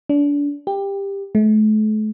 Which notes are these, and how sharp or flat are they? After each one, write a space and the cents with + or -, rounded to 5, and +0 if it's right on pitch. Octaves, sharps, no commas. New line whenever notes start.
D4 -30
G4 +15
A3 -40